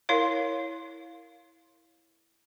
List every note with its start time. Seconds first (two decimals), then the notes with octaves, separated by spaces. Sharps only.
0.09 E4 A#4 C#5 F5